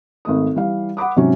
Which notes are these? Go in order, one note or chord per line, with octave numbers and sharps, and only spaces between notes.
G#1 A3 D#6
E3 G3 F5
F#5 B5 D6 D#6
G#2 C3 F#3 C#4